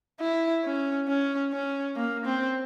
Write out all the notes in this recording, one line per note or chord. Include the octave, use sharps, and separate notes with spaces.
E4
C#4
C#4
C#4
A#3
C4